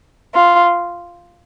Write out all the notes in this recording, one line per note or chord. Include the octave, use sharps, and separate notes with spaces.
F4